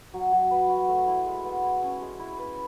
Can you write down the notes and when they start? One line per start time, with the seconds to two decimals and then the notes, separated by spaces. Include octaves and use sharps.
0.14 F#3
0.32 F#3
0.51 B4
0.69 F#4
0.88 A3
1.07 E4
1.26 G#3
1.45 B3
1.64 E4
1.83 C#4
2.01 G#3
2.19 E4
2.38 B4